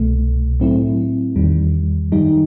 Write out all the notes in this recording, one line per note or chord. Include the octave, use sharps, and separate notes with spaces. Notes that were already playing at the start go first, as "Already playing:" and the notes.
Already playing: C2 B2 A3
A2 F#3 A3 C4 E4
E2 D#3 G3
F#2 D#3 G3 D#4